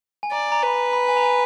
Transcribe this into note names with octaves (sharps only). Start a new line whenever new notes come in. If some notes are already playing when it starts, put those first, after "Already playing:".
G#5
D5 A#5
G#5
A#5
B4 B5
A#5
B5
G#5
A#5
G#5